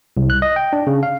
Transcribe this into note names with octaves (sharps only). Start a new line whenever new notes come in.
C2
F#6
D#5
G5
D4
C#3
F5